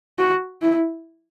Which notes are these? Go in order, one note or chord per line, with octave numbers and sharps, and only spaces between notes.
F#4
E4